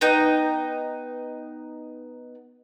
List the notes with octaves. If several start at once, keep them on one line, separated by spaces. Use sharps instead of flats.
B3 D#4 G5